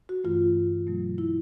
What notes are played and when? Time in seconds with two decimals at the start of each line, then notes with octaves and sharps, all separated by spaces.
0.09 F#4
0.24 G2 E3 A3 F4
0.87 B2 F#3 A3
1.18 E4